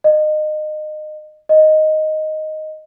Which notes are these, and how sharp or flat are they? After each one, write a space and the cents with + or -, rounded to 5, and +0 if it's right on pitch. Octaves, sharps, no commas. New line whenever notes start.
D#5 -25
D#5 +0